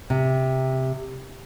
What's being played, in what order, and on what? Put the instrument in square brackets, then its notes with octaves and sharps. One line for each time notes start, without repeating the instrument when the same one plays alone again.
[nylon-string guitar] C3